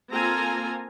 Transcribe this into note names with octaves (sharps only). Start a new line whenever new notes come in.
A#3 C4 F4 A4 G#5 A#5